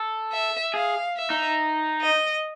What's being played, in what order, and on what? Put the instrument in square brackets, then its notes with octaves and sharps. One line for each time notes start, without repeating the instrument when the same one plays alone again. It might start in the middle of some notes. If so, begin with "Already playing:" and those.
Already playing: [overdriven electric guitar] A4
[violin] E5
[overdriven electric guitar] G#4 [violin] F5
[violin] E5
[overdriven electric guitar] D#4
[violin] D#5